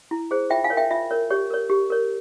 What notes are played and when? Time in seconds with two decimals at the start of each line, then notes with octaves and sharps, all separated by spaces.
0.11 E4
0.31 G#4 C5
0.50 F4 E5 G5
0.64 F5 G#5
0.70 A#4 C#5
0.77 E5 G5
0.91 F4 E5
1.11 A#4 C#5
1.30 G4 C#5
1.50 A#4 C#5
1.70 G4
1.90 A#4 C#5